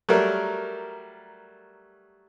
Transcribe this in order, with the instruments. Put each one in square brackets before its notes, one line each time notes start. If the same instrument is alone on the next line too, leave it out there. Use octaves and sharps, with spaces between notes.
[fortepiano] F#3 G3 A3 A#4